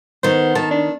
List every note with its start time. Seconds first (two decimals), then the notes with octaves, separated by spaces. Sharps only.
0.23 D#3 B3 C5
0.55 D#3 A5
0.71 D4